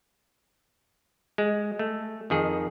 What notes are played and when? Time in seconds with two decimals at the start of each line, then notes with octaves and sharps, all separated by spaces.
1.38 G#3
1.79 A3
2.30 F2 D#3 G#4